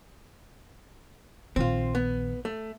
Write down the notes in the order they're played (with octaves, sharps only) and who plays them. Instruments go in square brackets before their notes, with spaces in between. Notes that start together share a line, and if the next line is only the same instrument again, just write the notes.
[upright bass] A#1 D#3 [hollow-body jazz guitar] C4 F4
[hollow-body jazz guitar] B3
A3